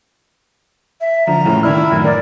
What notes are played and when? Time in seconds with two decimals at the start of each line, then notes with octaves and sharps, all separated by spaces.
1.01 E5
1.27 D3 F3 A#5
1.44 A2 C#3 E3
1.63 D#3 D4 E4 F6
1.92 F#2 A2 D#3
2.05 A#4 D5